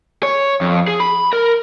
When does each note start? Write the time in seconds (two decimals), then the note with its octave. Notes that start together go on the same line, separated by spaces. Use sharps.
0.23 C#5
0.61 F2
0.88 G#4
1.00 B5
1.33 A#4